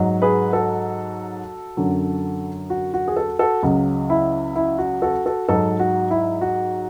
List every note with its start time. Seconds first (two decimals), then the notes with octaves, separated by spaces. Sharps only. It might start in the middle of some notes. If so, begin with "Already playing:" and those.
Already playing: G#2 F#3
0.22 G#4 B4
0.53 F#4 A4
1.77 F#2 D3 F#3
2.70 F#4
2.94 F#4
3.08 G#4
3.16 F#4 A4
3.39 F#4 A4
3.62 C#2 C#3 F#3
4.10 E4
4.56 E4
4.78 F#4
5.02 F#4 A4
5.26 F#4 A4
5.48 G#2 F#3 F#4 A4
5.79 F#4
6.11 E4
6.41 F#4